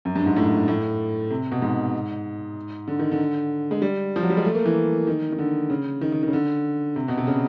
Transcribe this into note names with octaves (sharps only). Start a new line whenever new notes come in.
F#2
G2
G#2
A2
A2
C3
B2
G#2
D3
D#3
D3
G#3
G3
F3
F#3
G3
G#3
A3
A#3
E3
D#3
D#3
D3
C#3
D#3
D#3
D#3
C#3
D3
C3
B2
C3
C#3